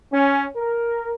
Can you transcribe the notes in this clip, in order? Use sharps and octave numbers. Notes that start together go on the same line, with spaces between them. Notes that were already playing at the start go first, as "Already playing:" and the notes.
C#4
A#4